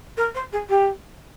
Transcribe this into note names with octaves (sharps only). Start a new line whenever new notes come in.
A#4
C5
G#4
G4